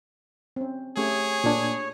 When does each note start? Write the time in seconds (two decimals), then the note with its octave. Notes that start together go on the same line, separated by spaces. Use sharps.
0.56 C4 C#4
0.97 A3 C#4 G4 G#4 C#5
1.44 A#2 D4